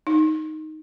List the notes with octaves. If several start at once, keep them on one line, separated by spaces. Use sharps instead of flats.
D#4